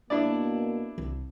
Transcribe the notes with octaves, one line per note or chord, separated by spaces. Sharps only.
B2 A#3 D4 E4 D5
C2